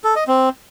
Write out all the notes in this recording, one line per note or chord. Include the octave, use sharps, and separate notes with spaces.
A4
D#5
C4